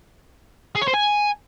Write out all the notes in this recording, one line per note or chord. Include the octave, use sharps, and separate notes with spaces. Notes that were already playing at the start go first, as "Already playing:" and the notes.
G#4
C#5
C5
G#5